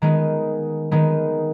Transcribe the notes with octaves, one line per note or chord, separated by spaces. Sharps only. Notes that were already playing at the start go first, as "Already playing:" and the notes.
D#3 G#3 B3 D#4
D#3 G#3 B3 D#4